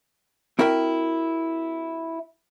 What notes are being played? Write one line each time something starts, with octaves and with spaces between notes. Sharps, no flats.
C4 E4 F#4 A#4 E5 G5